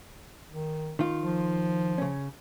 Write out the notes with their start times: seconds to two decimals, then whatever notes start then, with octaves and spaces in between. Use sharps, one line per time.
0.51 D#3
0.99 D#3 F4
1.21 F3
1.98 C#3 C#4